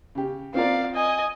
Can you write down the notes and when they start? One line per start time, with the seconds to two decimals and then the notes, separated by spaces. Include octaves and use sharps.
0.15 C#3 G4
0.54 C4 F4 A#4 D5 F5
0.95 D#5 G#5